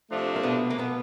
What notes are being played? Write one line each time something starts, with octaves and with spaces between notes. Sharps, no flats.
C3 F3 A3 D4
A#3
B2 B3
A#3
B2 B3